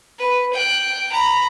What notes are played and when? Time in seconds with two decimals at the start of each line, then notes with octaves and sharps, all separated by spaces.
0.18 B4
0.53 G5 F#6
1.12 A#5 B5